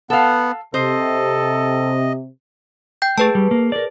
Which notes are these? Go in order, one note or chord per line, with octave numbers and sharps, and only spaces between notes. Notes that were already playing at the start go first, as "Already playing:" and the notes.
B3 A4 F5 F#5
C3 A4 C5 D#5
G5 G6
A3 G#4 B4 A5
G3
A#3
A#4 D5